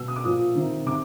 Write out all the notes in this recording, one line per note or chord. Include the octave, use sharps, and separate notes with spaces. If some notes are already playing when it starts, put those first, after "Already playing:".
Already playing: B2 E6
D#6
D6
A#2 F3 D#6
C3 D#3
C3 D6